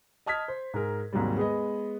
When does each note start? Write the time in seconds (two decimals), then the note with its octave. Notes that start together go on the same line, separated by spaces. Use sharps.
0.26 D#5 A5 D#6 F6 G#6 B6
0.48 C5
0.74 G#2 G#4 A#4
1.13 D#2 G#2 C3 F#3 G3
1.37 G#3 B3 G#4 B4 D#5